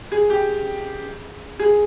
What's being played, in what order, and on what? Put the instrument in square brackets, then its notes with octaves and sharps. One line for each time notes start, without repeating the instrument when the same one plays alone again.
[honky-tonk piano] G#4
G4
G#4